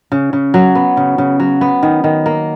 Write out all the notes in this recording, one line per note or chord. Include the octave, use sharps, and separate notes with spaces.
C#3
C#3
F#3
B3
C#3
C#3
F#3
B3
D#3
D#3
A#3